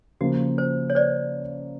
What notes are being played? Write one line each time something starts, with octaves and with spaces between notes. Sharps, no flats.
C#3 F3 A#3 F#4
C5
C#5
C5 D5